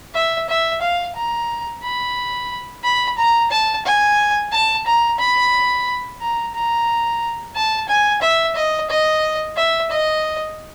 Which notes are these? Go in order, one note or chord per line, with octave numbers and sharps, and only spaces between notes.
E5
E5
F5
A#5
B5
B5
A#5
A5
G#5
A5
A#5
B5
A#5
A#5
A5
G#5
E5
D#5
D#5
E5
D#5